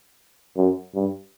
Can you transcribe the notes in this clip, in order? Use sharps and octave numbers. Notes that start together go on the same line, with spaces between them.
F#2
G2